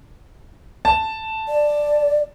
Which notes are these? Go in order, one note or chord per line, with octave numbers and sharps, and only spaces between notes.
A5
D5